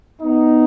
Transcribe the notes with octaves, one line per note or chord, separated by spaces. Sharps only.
B3 D#4